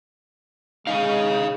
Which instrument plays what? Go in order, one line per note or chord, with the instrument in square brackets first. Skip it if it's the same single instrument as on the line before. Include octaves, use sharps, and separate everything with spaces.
[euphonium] G#3 [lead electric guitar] D#4 [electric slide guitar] G#4 C#5 F5